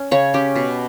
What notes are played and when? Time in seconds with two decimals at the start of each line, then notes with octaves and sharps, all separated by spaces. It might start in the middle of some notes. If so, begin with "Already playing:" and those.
Already playing: C#4
0.11 C#3 C#5
0.34 C#4 G4
0.56 B2